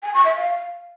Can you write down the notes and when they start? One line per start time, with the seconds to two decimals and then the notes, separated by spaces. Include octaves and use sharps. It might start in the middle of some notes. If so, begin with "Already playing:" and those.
0.03 G#5
0.14 C#6
0.25 E5
0.36 F5